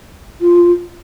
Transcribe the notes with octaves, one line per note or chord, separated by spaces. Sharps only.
F4